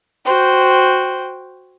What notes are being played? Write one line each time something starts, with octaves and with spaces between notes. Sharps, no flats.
F#4 C5 G5